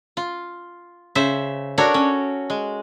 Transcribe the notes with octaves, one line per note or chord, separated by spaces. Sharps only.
F4
C#3 C5 E5
D4 F#4 A4 A#4 C#5
C#4
G#3